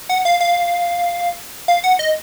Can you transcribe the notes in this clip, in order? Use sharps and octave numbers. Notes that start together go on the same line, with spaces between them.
F#5
F5
F5
F5
F#5
D#5